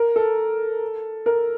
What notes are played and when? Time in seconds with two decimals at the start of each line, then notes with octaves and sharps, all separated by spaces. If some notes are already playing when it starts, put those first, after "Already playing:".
Already playing: A#4
0.16 A4
1.26 A#4